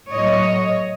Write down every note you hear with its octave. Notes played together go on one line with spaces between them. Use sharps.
A2 F#3 A3 C#5 D#5